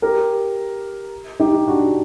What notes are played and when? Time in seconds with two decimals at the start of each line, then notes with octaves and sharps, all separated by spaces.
0.02 G4 A#4
1.40 D#4 G4
1.68 D4 F#4